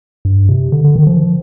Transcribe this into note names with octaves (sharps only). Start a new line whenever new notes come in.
G2
C3
D3
D3
D#3
F3